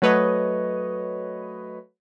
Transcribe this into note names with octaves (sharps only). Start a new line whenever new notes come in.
F#3 A3 B4 C#5 D#5